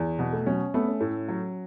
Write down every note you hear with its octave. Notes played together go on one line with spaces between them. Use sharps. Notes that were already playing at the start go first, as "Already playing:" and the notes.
Already playing: E2
B2 B3
A3
F#3 C#4
A3 B3
C#4
A2
F#3